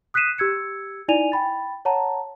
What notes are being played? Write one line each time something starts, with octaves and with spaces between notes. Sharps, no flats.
D#6 F#6 B6 C7 D#7 E7
G4 E6 G#6 C#7
D#4 E4 D5 G#5 D#7 F7
G5 B5 A6
C#5 F#5 A5 A#5